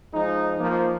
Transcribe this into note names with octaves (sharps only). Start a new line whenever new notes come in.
F3 G#3 D#4
F3 A#3